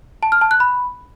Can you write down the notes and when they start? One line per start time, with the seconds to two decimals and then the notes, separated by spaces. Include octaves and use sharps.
0.23 A5
0.32 F6
0.41 A5
0.51 F#6
0.60 B5